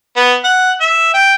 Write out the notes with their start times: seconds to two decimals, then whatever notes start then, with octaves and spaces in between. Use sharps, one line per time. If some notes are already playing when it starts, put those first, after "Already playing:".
0.16 B3
0.44 F#5
0.81 E5
1.14 G5